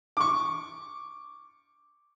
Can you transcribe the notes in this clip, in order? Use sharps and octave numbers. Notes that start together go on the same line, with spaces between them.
C#6 D6